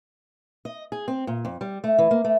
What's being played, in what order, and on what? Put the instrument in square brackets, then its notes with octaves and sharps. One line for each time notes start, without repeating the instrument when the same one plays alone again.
[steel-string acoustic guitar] D#5
G#4
C4
A#2
F2
G3
A3
E3
A#3
A3